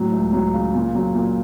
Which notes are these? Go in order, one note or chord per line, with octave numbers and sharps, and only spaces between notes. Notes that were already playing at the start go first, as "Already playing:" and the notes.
Already playing: A2 F#3
C#2
F#3
C#3
A#2
F#3
A#2